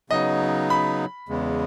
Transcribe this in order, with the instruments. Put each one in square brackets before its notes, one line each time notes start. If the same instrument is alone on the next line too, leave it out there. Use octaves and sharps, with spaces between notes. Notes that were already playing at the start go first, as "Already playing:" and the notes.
[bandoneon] C#3 F#3 B3 D#4 [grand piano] D#5
[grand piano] B5
[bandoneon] E2 C#3 G#3 B3